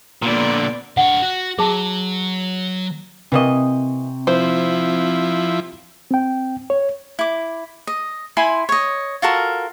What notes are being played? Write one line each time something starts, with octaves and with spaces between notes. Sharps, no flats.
A#2 D3 B3 D5
D3 C#5 F#5
F#4
F#3 G#4 A5
C3 E3 A#3 C4 D#5 G5 C#6
F3 E4 C5
C4 G5
C#5
E4 D6
D#5
E4 G#5 B5 C6
C#5 D#5
F4 F#4 A4 A#4